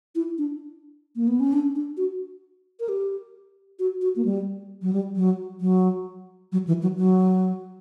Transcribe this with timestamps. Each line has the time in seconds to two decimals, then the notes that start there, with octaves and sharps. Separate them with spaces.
0.15 E4
0.38 D4
1.16 A#3
1.28 B3
1.40 C#4
1.53 D4
1.75 D4
1.97 F#4
2.80 A#4
2.89 G4
3.79 F#4
4.02 F#4
4.16 A#3
4.25 G3
4.82 F#3
4.93 G3
5.16 F#3
5.61 F#3
6.52 F#3
6.67 E3
6.82 F#3
6.97 F#3